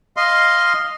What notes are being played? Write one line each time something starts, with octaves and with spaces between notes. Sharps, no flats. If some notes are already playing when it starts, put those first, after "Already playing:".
D#5 F5 C6